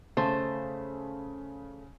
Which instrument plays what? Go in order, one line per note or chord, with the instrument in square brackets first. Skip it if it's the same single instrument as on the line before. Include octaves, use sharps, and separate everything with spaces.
[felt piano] C#3 [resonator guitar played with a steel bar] A3 C5